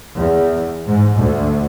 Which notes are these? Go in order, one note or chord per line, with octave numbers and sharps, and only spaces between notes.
E2
G#2
D2